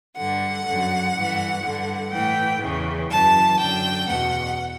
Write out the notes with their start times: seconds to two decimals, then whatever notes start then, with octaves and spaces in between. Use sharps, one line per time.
0.16 G2 D3 F#5
0.66 F#2 D3
1.15 G2 E3
1.63 G2 D3
2.12 A2 E3 G5
2.62 E2 C#3 E3
3.10 F#2 E3 A5
3.59 F#2 D3 G5
4.08 E2 B2 F#5